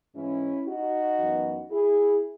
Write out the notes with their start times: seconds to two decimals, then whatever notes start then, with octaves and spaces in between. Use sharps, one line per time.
0.15 G#2 E3 G#3 C#4 E4
0.67 D#4 F#4
1.19 F#2 E3 B3
1.71 E4 G#4